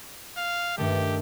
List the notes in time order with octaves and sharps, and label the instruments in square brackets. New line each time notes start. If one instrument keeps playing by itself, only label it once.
[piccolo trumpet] F5
[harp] G2 D#3 A3 [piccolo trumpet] G4